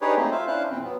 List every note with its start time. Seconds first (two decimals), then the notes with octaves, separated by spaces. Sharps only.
0.01 D4 D#4 G4 G#4 B4 C#5
0.16 F#3 A3 A#3 C4 D#4
0.31 F4 C5 E5 F5
0.47 C#4 D4 E4 C5 F5 F#6
0.69 E2 A#2 C4
0.84 F#3 B3